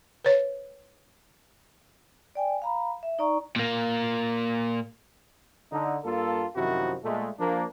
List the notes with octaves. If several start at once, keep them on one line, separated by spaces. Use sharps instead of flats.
B4 C#5
D5 G5 G#5
F5 A#5 B5
E5
D#4 D5 A#5 C#6
A#2 A#3
D3 D#4
G2 A#3 F4 A4
F#2 C3 D#3 F3 E4 F#4
A#2 G#3 A3
F3 A#3 D4